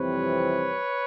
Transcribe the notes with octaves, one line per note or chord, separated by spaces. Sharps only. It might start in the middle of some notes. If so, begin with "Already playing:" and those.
Already playing: F2 C3 E3 G3 C4 B4 C#5